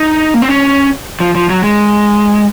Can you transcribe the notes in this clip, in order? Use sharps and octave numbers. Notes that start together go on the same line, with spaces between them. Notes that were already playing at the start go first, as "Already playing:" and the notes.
Already playing: D#4
A#3
C4
C#4
F3
F3
F#3
G#3